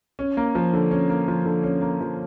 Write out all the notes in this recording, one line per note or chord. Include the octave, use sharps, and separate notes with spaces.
C#4
A#3
F3
D3
C#4
A#3
F3
D3
C#4
A#3
F3